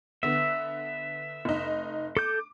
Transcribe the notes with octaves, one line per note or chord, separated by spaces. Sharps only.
D3 B3 E5
F1 D#4
A4 D6 G6